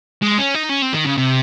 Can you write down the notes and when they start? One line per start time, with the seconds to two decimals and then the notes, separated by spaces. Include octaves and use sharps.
0.22 G#3
0.38 C#4
0.54 D#4
0.69 C#4
0.82 C4
0.94 D#3
1.06 C#3
1.18 C3